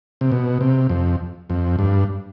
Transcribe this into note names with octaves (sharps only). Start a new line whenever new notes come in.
C3
B2
C3
F2
F2
G2